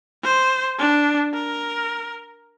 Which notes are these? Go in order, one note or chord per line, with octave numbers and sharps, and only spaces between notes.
C5
D4
A#4